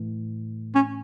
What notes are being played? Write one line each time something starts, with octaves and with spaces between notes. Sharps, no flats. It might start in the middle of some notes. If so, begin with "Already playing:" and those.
Already playing: A2 E3
C#4